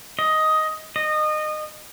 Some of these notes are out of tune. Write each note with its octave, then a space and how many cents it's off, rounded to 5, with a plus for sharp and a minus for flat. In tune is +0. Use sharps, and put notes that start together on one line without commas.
D#5 +10
D#5 -25